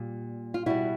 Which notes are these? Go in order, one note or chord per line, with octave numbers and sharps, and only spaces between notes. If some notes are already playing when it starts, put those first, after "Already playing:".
Already playing: A#2 G3
F4
B2 G3 E4 F#4